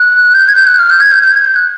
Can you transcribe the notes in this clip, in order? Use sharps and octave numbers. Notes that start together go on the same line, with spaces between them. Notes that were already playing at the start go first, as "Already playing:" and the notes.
Already playing: F#6
G6
G#6
G6
F#6
F6
G6
G#6
G6
G6
G#6
G6
F#6